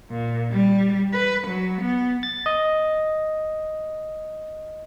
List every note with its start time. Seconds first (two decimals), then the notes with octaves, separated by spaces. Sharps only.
0.10 A#2
0.51 G3
1.14 B4
1.47 F#3
1.81 B3
2.23 A6
2.46 D#5